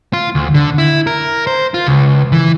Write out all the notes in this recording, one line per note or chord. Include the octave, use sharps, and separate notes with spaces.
F4
D2
D3
E4
A#4
C5
F4
C#2
E3